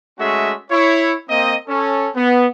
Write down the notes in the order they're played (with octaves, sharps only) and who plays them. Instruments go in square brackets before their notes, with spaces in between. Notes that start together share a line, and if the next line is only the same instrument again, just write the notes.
[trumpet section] G#3 A3 C#4 F#4 G#4 E5
E4 C#5
A#3 C4 D#5
C#4 A4
B3